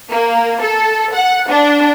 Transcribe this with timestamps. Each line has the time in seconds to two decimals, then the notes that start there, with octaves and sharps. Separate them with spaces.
0.11 A#3
0.61 A4
1.14 F#5
1.49 D4